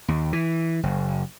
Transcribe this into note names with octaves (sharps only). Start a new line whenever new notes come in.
D#2
E3
F#1